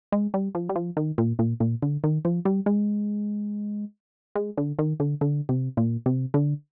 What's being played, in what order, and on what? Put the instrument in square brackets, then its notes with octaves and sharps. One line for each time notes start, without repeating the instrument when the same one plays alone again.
[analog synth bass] G#3
G3
F3
G3
F3
D#3
A#2
A#2
A#2
D3
D#3
F3
G3
G#3
G#3
D3
D#3
D3
D3
C3
A#2
C3
D3